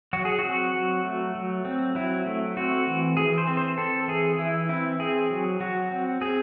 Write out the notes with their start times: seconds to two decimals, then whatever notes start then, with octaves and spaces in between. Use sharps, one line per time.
0.13 F#3 F#4
0.25 G#4
0.39 F#4
0.44 C4
0.74 F#3
1.04 A3
1.35 F#3
1.65 C4
1.95 F#3 E4
2.26 A3
2.57 C4 F#4
2.87 E3
3.17 E3 G#4
3.38 C5
3.47 C4
3.57 C5
3.78 C4 A4
4.08 E3 G#4
4.38 E3 E4
4.69 C4 E4
4.99 C4 G#4
5.30 F#3
5.60 F#3 F#4
5.91 C4
6.21 C4 G#4